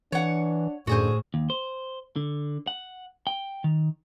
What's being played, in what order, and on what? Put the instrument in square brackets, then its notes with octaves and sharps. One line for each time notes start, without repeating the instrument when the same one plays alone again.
[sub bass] E3 [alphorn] D4 [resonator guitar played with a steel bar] C#5 F#5
[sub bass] F#2 [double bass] A2 [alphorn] D3 [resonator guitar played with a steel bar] F#4 G#4 C5
[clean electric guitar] D#2
C5
D3
F#5
G5
D#3